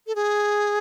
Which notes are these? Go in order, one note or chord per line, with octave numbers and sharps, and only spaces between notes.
A4
G#4